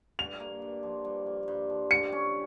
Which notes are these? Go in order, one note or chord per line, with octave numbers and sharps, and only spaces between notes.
G2 F7
A#3
G2
F3
G2
A#3
G2
F3
G4 C#7
C#4